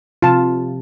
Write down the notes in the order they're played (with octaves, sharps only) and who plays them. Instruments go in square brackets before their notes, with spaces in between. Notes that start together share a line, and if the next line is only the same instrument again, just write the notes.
[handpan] C3 F3 [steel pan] F4 A5